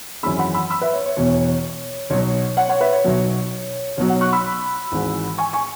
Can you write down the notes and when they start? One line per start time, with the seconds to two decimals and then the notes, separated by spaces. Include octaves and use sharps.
0.23 G#1 F#2 E3 G#3 B5 E6
0.39 F#5 B5
0.54 B5 E6
0.70 B5 E6
0.81 B4 E5
0.93 C#5
1.06 C#5
1.16 E1 E2 B2 C#5
2.10 B1 B2 F#3 C#5
2.57 C#5 F#5
2.69 C#5 F#5
2.81 B4 E5
2.93 C#5
3.04 B1 B2 F#3
3.97 B1 B2 F#3 C#5
4.09 C#5 F#5
4.21 C#6 F#6
4.33 B5 E6
4.92 G#1 G#2 E3 G#3
5.38 G#5 C#6
5.53 G#5 C#6